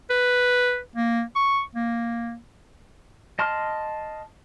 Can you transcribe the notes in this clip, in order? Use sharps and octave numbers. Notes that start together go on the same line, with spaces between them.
B4
A#3
C#6
A#3
D#5 A5 C6 F6